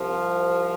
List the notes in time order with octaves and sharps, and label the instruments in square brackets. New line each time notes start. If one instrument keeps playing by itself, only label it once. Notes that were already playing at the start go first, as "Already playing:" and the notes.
Already playing: [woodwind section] C2 C3 F3